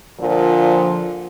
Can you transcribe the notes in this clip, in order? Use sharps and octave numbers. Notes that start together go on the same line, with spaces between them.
A#2 D3 F3